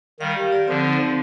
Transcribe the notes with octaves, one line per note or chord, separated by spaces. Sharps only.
D#3 G3 F5
G4
D5
D3 F3 C4
D#4
C4